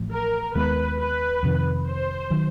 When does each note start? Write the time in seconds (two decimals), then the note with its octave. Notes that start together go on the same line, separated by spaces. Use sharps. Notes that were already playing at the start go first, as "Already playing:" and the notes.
Already playing: A1 A2 F3
0.12 A#4
0.55 D#2 D#3 G#3 B3 B4
0.99 B4
1.43 F2 C3 D#3
1.86 C5
2.30 D#3 F#3